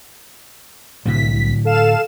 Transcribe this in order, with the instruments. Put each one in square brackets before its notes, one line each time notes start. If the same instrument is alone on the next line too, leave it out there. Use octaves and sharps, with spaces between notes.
[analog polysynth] C2 B6 [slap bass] A2 D3 F#3
[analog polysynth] A4 F5 E7